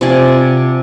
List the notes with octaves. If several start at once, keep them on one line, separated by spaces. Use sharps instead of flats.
C3 F3 D5 G#5